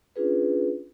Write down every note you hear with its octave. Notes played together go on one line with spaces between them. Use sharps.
C#4 D4 F4 G#4 B4